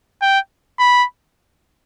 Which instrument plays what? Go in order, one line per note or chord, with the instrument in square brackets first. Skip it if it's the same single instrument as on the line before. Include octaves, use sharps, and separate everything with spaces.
[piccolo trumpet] G5
B5